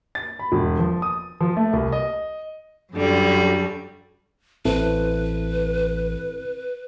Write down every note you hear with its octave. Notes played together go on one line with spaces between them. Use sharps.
A6
B5
E1
F3
D#6
F3
A3
C2
D#5
F#2 D3 F#3 G3
A1 C4 E4 A4 B4